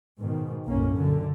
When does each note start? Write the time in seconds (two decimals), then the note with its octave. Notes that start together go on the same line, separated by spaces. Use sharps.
0.20 G#2 B2 D#3
0.67 F#1 B1 A2 A#3 C#4
0.95 F#2 A#2 D3